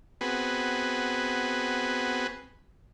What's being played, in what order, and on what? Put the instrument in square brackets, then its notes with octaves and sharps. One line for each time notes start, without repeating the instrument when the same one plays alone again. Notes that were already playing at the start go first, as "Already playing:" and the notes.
[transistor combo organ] B3 C4 F#4 G#4 B4